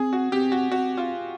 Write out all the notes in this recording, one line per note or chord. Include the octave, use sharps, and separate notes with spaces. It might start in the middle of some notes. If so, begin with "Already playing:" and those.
Already playing: C4 G#4
F#4
C4 G4
F#4
C4 F#4
F4